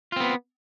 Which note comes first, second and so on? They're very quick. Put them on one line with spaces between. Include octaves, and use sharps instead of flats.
F4 C4 B3